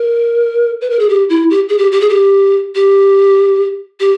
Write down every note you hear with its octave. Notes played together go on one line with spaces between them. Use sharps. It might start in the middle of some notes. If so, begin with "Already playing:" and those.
Already playing: A#4
B4
A#4
G#4
G4
E4
G4
G#4
G4
G4
G#4
G4
G4
G4